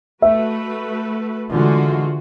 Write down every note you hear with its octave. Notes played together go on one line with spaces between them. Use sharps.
A3 F#4 B4 E5
D3 E3 G#3 F4 F#4